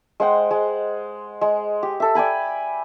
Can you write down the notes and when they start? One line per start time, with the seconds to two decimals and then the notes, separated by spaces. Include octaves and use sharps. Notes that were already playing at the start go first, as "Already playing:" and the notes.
0.20 G#3 C5 F#5 G5
0.51 G#3
1.41 G#3
1.83 G4
2.00 A4 E5
2.15 D5 G5 G#5 B5